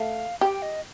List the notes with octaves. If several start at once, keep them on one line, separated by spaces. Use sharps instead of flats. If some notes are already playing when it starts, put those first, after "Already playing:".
Already playing: A3 F5
G4 G5
D#5